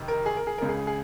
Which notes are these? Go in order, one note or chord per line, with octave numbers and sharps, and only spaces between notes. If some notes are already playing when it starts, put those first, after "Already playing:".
Already playing: F2 C3 D#3
A#4
G#4
A#4
G#4
C#2 C#3 A#4
G#4
G#4